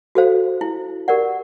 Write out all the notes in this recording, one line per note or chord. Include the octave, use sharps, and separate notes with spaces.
F#4 A4 C5 F5
E4
G4 A#4 D5 F#5